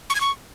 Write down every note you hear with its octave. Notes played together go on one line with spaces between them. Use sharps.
C#6
G#6
C#6